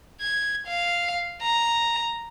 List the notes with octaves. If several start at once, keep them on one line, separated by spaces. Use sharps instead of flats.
G#6
F5
A#5